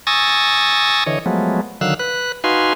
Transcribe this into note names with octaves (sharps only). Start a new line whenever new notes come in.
G#5 C#6 D#6 E6 A6 A#6
D3 E3 C#5 D#5
F3 F#3 G#3 A3 B3
D3 D#3 F#3 F5 E6 F#6
B4 F#6
D#4 F#4 B4 F5 G#5 C6